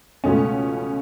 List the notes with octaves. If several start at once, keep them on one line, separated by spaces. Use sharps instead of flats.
C#2 B2 A3 C#4